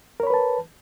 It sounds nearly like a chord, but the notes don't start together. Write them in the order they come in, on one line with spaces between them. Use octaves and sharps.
A#4 C#5 B5 B4 A5